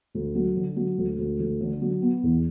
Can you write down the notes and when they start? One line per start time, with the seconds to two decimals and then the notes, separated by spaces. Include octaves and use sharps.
0.15 D2
0.35 F#3
0.56 D3
0.76 F#3
0.98 D2
1.18 D2
1.40 D2
1.61 D3
1.82 F#3
2.02 B3
2.24 E2